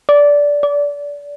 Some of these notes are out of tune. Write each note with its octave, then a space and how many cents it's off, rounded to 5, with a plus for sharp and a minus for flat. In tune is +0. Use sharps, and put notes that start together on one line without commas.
D5 -15
D5 -25